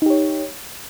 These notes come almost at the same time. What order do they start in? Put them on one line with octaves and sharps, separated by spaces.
D#4 G4 C#5